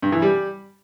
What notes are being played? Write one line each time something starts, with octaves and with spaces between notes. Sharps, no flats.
G2
E3
G3